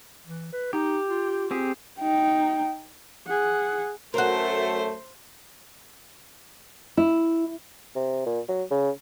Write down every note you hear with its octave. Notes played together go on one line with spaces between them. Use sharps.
E3
B4
D#4 G4
F4
C4 G4 G#4
D#4 G5
G#4 F#5
F#2 A3 F#4 A#4 C5
E4
C3
A#2
F#3
C#3